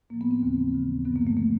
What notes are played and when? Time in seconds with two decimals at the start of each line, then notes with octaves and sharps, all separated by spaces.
0.10 A2 F3 A#3
0.21 B3
0.31 C4
0.42 D#2 C#3 E3
0.73 D#2 C#3 E3
1.05 G2 D3 F3 B3
1.16 A#3
1.27 A3
1.36 D3 F3 A#3